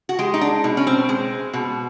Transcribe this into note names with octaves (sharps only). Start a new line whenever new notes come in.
F#4
G#3 G4
D#4
D4
B2
C#4
C4
G#3
B2